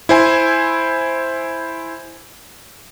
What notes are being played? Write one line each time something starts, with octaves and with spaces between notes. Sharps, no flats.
E4 C5 G#5